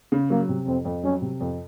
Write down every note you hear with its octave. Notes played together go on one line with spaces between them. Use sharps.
C#3
F#3 A#3
C3
F2 C4
F2
F#3 C#4
C3
F2